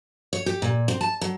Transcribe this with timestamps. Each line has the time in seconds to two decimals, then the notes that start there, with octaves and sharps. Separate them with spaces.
0.33 C#5
0.46 G4
0.62 A#2
0.88 C4
1.01 A5
1.21 F#3